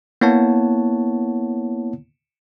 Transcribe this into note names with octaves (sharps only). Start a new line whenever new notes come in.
A#3 B3 E4 C#5 F#5 A5